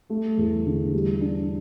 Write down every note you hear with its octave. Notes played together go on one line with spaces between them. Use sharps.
A3
E2
D3
G3
D4